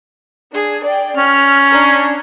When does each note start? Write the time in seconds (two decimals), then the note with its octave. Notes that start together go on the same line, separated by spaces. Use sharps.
0.52 D4 G#4
0.85 D5 G5
1.17 C#4 F6
1.71 D4 A#5